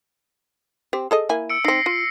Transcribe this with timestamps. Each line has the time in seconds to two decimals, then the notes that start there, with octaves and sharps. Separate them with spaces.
0.93 C4 G4
1.11 G#4 A4 D#5
1.29 A#3 E4 G#5
1.50 E6 C#7 D7
1.65 C4 D#4 A#6 C7
1.86 F4